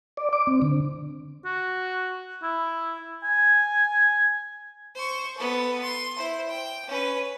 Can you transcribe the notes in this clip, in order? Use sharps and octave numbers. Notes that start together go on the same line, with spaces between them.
D5
D6
C4
D3
F#4
E4
G#5
C5 C#6
B3 A4
C6
E4 C5
G5
C#4 B4